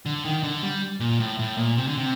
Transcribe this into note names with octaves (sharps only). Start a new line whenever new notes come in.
D3
D#3
D3
G3
A#2
A2
A2
A#2
C3
D3
C3